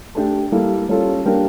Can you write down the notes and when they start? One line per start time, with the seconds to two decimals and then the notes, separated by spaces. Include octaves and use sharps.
0.15 A3 D4 G4
0.52 G3 A#3 E4 A4
0.89 G3 C#4 F4 A4
1.25 G3 A#3 D4 G4 A#4